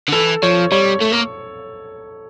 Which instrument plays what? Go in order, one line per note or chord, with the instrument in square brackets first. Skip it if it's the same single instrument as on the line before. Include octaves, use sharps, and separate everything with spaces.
[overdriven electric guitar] D3
[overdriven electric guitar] E3 [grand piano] A4
[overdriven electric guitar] F3 [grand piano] C#5
[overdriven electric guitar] G3 [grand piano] C#5
[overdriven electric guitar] A3
A#3